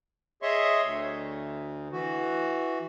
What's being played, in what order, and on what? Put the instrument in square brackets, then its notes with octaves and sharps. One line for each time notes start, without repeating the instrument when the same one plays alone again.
[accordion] G#4 C#5 D#5 E5 C6 C#6
D2
E3 F#4